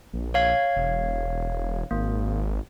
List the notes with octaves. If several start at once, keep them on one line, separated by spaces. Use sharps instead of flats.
A#1
C#5 F5 G#6
E1
G#1 A#3